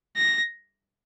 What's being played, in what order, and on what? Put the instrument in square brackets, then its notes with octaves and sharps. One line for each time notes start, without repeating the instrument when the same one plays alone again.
[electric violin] A#6